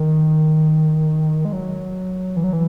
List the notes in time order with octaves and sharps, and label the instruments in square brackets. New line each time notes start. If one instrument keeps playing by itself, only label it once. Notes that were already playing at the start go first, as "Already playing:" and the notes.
Already playing: [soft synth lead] D#3
G#3
F#3
E3
F#3
E3